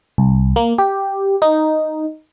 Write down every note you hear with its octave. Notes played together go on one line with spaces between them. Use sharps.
C2
A#3
G4
D#4